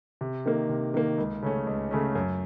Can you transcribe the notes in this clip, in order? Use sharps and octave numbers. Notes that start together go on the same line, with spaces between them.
C3
D#3 A#3
C3
D#3 A#3
C#2
C#3 A3 C#4
C#2
C#3 A3 C#4
F#2